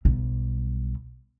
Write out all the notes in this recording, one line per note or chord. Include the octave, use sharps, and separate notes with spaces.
B1 G3